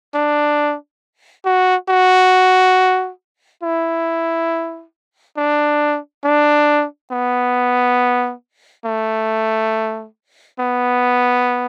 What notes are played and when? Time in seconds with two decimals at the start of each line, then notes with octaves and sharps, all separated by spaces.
0.15 D4
1.45 F#4
1.89 F#4
3.63 E4
5.37 D4
6.24 D4
7.12 B3
8.85 A3
10.60 B3